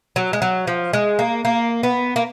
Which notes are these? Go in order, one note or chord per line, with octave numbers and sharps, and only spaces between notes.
F#3
G#3
F#3
F3
G#3
A#3
A#3
B3
A#3